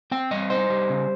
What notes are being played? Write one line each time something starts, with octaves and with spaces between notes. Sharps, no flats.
C4 G5
G3 D#5
D#4 C5
G3
C#3